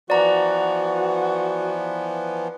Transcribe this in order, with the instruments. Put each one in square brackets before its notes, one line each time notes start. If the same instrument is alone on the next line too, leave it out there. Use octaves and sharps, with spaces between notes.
[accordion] E3 F3 B3 [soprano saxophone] F#4 [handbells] D5 A#5